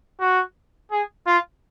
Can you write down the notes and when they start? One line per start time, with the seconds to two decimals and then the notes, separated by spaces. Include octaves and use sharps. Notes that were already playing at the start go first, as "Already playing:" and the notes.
0.20 F#4
0.91 G#4
1.27 F4